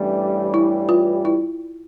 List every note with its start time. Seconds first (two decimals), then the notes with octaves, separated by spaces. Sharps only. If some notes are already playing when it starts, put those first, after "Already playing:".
Already playing: A1 G2 E3 G3
0.54 E4
0.89 F4
1.25 E4